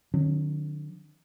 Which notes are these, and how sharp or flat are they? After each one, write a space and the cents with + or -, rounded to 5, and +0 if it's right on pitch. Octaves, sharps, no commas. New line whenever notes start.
D3 +40 F#3 -35 C#4 -25